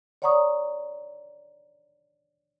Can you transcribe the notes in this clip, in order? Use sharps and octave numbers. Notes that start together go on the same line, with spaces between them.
C#5 D5 F#5 A#5 C#6 D#6